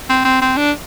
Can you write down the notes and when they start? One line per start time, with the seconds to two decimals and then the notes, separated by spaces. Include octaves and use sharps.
0.09 C4
0.25 C4
0.41 C4
0.57 D4